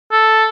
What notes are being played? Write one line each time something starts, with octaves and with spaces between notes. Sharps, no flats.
A4